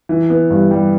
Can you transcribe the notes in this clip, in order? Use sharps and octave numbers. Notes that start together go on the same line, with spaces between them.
E3
B3
G2
G3